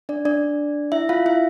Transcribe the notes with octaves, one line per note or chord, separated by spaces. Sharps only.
D4 D5
D4 D5
E4 E5
F4 F5
E4 E5